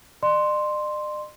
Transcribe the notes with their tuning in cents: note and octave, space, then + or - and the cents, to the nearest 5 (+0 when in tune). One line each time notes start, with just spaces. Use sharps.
D5 +45 C6 +0